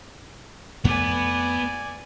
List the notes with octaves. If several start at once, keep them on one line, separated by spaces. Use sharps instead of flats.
F2 A3 B3 D5 G#5